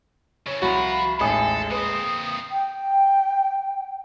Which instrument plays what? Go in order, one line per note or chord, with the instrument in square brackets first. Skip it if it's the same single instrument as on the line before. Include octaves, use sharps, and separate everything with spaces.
[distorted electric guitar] C#3 E4 [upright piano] C#5
[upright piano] C2 [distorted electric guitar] F3 F4 [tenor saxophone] F#4 [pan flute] B5
[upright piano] A1 D#2 D#6 [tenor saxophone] G#3 [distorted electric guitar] A4 [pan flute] G#5
[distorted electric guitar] A#2 C4 [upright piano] B4 [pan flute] D#6
[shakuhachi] G5